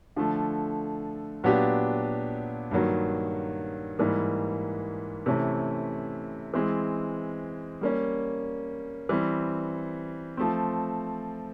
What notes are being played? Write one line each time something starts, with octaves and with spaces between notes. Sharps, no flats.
D3 F3 A3
A#2 F#3 B3 D4 G4
G2 D#3 F#3 A#3
G#2 E3 G3 A#3
C3 E3 A3 C#4
E3 G#3 C4
G3 A#3 C#4
E3 G3 C4
F3 A3 C4